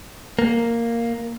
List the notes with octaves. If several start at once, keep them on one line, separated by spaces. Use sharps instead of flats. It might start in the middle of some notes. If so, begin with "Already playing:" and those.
A#3